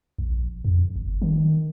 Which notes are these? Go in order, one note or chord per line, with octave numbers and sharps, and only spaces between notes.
A#1
F2
G1
D#3